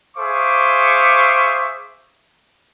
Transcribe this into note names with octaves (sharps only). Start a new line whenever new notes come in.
G#4 C5 E5 F5 C#6 D6